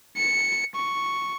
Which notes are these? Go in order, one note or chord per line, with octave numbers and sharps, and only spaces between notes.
C#7
C#6